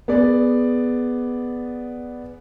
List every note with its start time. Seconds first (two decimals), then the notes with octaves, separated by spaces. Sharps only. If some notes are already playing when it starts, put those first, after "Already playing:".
0.08 B3 G#4 D5